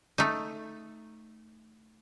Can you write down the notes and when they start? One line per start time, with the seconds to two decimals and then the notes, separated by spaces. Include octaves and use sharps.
0.18 A3 D#4